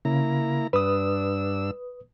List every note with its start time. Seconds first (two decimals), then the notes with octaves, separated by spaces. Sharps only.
0.05 C#3 A#3 E4 A#5
0.73 G2 D4 B4 D#6 E6